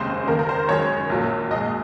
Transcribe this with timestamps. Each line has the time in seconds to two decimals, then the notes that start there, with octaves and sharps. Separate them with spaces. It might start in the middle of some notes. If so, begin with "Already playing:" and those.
Already playing: F1 D#2 C#3 G#3 C5
0.27 D#2 D#3 A#3 A#4
0.39 A#4
0.49 C5
0.68 F#2 D#3 G#3 C#5
1.10 A#1 A#2 F#3 A#3
1.50 A#1 A#2 G#3 D#5